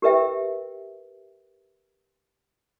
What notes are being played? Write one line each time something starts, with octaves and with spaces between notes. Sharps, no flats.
G4 A#4 B4 E5 G5